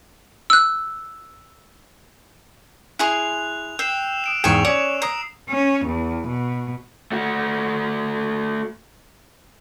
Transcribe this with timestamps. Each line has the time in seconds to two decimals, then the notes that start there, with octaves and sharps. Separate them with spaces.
0.50 E6 F#6
2.99 E4 G#4 C6 F#6 F7
3.79 G5 E6 C7 E7
4.24 D#6 D7 E7
4.44 E2 G#2 G#4 G5 G#5 C#6 E7 F7
4.65 C#4 C#5 D5
5.02 A#5 D#6 C7
5.49 C#4
5.86 E2
6.28 B2
7.12 A3 F#4